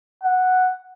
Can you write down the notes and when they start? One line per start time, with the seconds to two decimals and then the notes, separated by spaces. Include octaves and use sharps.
0.23 F#5